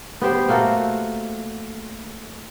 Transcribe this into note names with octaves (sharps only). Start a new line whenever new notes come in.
B3 G4 C5
A3 A#3 F#4 A4